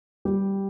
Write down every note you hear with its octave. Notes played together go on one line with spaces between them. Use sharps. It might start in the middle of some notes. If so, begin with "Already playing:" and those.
G3 G4